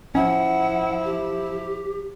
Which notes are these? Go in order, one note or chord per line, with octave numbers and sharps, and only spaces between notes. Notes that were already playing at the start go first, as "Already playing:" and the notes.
F3 C#4 E4 F#5
G4